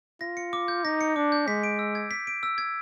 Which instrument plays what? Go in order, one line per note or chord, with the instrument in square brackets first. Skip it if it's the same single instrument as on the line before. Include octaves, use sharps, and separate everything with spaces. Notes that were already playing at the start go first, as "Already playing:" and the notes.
[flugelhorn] F4 [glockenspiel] A#6
[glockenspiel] C#7
D6
G6
[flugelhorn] D#4 [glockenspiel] A#6
[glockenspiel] C#7
[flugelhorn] D4 [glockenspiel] D6
[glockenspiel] G6
[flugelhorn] G#3 [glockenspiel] B6
[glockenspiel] D7
E6
G#6
B6
D7
E6
G#6